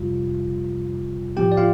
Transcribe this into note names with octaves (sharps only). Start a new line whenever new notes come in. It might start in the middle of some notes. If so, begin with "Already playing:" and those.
Already playing: F2 C3 G3 F4
A1 A2 F3 C4 G4 G5
D5
F4 F5